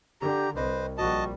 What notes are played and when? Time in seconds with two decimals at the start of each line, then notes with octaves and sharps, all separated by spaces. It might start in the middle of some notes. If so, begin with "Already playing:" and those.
0.21 D3 G4 A#5
0.56 C2 B4 C5 D#5
0.98 A#1 G3 F#4 D#5 A5